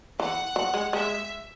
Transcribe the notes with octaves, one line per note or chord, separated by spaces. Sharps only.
E3 F#5
F#3
G#3
G#3 E5